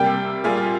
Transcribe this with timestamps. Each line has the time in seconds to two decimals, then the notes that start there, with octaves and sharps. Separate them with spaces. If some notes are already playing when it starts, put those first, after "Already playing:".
Already playing: C3 G3 A#3 G5
0.44 A#2 G3 A#3 F4 G#4